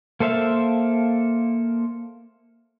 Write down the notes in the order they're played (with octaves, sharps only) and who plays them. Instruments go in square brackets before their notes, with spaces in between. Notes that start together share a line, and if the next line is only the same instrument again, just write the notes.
[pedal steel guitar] A#3 A4 C5 E5 F5